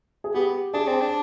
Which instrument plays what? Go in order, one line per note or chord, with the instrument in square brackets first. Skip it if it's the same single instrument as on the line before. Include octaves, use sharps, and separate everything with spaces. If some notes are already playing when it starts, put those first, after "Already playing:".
[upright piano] G#4
[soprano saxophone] B3 [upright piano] G4
[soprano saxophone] D4 [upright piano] G#4
[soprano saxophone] C4
D4